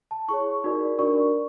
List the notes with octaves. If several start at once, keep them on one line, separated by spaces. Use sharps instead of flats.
A5
E4 G#4 C#5 C#6
D#4 F#4 A#4 D5
D4 F#4 A#4 D5 C#6